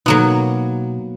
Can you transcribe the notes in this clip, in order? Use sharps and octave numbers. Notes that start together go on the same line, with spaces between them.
B2 F#3 A#3 B3 D#4 A4